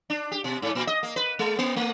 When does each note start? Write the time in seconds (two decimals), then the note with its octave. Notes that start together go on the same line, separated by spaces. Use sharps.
0.10 D4
0.32 G4
0.44 B2
0.62 G#2
0.75 A#2
0.87 D#5
1.03 A#3
1.16 B4
1.39 G#3
1.59 A#3
1.76 A3